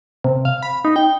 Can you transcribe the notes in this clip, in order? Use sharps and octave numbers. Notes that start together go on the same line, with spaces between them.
C3
F5
B5
D#4
G5